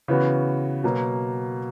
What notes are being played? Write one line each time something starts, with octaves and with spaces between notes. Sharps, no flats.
C#3 E3 B3 F#4
B2 F#3 A#3